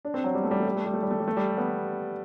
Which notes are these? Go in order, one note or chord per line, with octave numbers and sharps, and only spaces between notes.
D4
C4
F#3
G3
A3
G3
A3
G3
A3
G3
A3
G3
A3
G3
A3
G3
B3